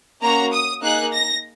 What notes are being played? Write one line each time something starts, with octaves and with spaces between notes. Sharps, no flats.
A#3 C#4 F#4 A#5
D#6
A#3 D#4 G#4 F#6
A#6